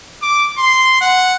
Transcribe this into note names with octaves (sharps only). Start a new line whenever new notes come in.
D6
C6
F#5